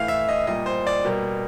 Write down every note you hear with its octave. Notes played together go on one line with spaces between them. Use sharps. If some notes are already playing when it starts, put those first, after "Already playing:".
Already playing: A2 E3 A3 F5
E5
D#5
A#2 G3 A#3 D#5
C5
D5
B2 G3 A#3